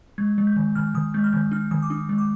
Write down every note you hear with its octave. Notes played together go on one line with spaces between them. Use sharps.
G#3 G#6
G#3
G6
D#3
D#3 F6
D#3 D#6
G#3 G6
F6
D#3 G6
D4 F6
D#3 D#6
D6
D4 D#6
G#3
D6